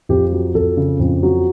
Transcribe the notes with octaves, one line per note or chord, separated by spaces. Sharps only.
F2 G4
F#3
F2 A4
C#3
F2
F#3